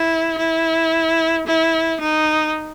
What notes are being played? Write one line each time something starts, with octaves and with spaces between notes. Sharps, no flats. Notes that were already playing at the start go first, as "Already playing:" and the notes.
Already playing: E4
E4
E4
D#4